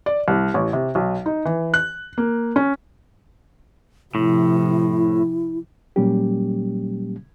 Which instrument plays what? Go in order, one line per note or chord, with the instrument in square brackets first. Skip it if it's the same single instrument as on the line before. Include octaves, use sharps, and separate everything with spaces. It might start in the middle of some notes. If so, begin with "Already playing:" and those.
[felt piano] D5
C2
A1
C3
B1
D#4
E3
F#6
A#3
C#4
[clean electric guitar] A2 [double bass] C3 F3 [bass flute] E4
[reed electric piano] A#2 F#3 G3 A#3 C#4 G4